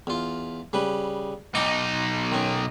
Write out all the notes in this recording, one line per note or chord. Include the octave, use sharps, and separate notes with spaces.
E2 F4
C#3 G3 B4
B1 D#4 G5 C#6 D6
D#3 C#4